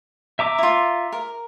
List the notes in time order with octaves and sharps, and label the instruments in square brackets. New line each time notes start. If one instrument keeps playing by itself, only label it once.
[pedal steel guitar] E5 A#5 D6
[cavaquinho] E4 F4
A#4